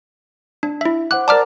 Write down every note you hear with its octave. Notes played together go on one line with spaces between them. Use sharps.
D4
E4 E5
C5 F#5 D6 F#6
A#4 D5 A5 A#5 D6 F6